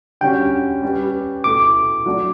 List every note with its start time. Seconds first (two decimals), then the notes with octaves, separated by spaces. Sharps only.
0.21 D3 G3 C#4 F#4 G5
0.82 G3 C#4 G4 B4
1.44 B2 A3 E4 A4 D6
2.06 F#3 A3 D4